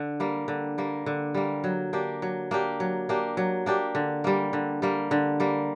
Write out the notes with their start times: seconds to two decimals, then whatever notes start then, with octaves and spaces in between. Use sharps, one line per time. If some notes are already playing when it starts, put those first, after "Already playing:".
Already playing: D3
0.20 G3 A#3
0.48 D3
0.78 G3 A#3
1.06 D3
1.34 G3 A#3
1.64 F#3
1.93 A#3 D4 G4
2.22 F#3
2.51 A#3 D4 G4
2.80 F#3
3.09 A#3 D4 G4
3.37 F#3
3.66 A#3 D4 G4
3.95 D3
4.24 G3 A#3
4.53 D3
4.82 G3 A#3
5.11 D3
5.40 G3 A#3